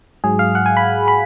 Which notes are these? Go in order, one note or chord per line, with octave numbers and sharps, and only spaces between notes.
G#2 F#3 G#4
F5
F#5
G#5
B5
B5